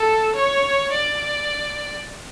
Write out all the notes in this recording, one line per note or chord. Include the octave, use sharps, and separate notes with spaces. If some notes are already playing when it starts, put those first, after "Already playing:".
Already playing: A4
C#5
D5